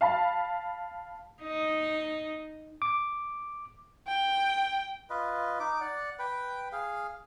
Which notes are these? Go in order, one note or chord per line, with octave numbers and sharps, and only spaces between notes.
F5 A5 B5
D#4
D6
G5
F4 B4 D#5
D#4 D6
D5 F#5
B4 G5
G#4 F5